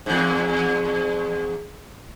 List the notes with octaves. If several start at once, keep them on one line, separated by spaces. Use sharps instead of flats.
E2 G#2